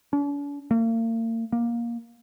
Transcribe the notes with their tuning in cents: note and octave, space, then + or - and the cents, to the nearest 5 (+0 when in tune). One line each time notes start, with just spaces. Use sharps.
D4 -45
A#3 -40
A#3 +15